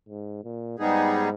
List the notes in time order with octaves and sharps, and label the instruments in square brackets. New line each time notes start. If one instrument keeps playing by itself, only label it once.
[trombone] G#2
A#2
[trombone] G#2 [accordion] G3 B3 D#4 G#4